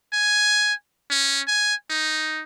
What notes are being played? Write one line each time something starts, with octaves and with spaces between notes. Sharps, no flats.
G#5
C#4
G#5
D#4